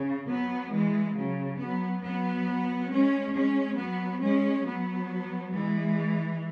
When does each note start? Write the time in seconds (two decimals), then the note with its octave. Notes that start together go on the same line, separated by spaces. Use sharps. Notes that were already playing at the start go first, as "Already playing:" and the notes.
Already playing: C#3
0.28 F#3 B3
0.72 E3 G#3
1.15 C#3 F#3
1.60 F#3 B3
2.03 F#3 B3
2.91 G#3 C#4
3.35 G#3 C#4
3.78 F#3 B3
4.22 G#3 C#4
4.66 F#3 B3
5.53 E3 G#3